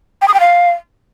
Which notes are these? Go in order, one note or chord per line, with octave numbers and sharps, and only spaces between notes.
G5
D#6
G5
F5